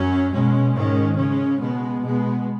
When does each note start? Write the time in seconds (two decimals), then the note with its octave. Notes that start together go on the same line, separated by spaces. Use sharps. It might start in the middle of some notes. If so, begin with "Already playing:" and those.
Already playing: F#2 F#3 C#4
0.33 B2 G#3 C#4
0.75 G#2 D#3 G#3 C#4
1.17 C#3 G#3 C#4
1.59 B2 G#3 B3
2.02 B2 G#3 B3